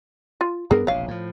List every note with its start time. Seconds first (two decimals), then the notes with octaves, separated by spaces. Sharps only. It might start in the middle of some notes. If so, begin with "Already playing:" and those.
0.41 F4
0.71 G2 B3 D4 G#4 A#4
0.87 E1 A#1 C3 C#5 F5
1.08 A2 F3